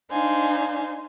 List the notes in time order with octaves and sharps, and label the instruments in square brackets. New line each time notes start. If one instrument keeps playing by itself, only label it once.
[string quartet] D4 D#4 C5 F5 G#5